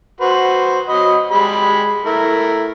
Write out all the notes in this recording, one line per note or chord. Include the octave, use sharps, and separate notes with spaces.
F#4 B4 C5
F#3 D#5 B5
G3 G#3 B5
A3 E4 A#4